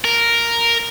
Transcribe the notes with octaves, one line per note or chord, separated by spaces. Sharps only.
A#4